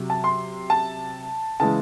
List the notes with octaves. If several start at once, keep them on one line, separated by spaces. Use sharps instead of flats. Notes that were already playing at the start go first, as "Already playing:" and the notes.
Already playing: C3 F#3
A5
C6
A5
C#3 E3 G#3 A5